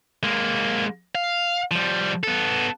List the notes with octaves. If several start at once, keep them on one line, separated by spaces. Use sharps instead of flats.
G#3 A#3
F5
F3 G3
B3 A4